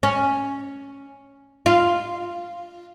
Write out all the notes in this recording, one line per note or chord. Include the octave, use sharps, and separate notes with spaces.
C#4
F4